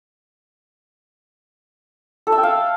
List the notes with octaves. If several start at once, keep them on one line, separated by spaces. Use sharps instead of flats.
A4
E5
G5
F5